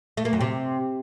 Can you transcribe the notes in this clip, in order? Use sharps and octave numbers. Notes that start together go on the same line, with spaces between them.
A3
A#3
F#2
C3